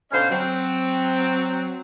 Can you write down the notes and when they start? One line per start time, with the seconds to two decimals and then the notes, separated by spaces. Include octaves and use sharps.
0.12 B2 D3 C#4 C5 D#5 F5
0.31 F#3 C4